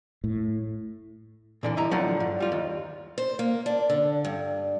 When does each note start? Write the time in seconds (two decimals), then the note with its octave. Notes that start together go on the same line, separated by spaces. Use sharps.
0.24 A2
1.63 A#2 D3 E3
1.77 F#2 G3 E4 D#5 A#5
1.91 A2 D3 F3 F#3
2.20 G2
2.40 G3 F4
2.52 D#2
3.18 C5
3.39 A#3
3.66 D4
3.90 D3
4.25 G2